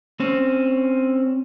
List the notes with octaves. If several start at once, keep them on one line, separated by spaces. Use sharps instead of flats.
C4 C#4